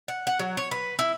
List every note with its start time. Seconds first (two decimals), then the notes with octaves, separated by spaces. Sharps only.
0.08 F#5
0.27 F#5
0.39 F#3
0.57 C#5
0.71 B4
0.99 E4